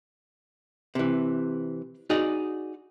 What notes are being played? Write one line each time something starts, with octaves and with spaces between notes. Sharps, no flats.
C3 E3
D#4 F#4 G#4 D5